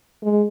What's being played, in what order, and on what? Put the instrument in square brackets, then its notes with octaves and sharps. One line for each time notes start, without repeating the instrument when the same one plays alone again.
[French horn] G#3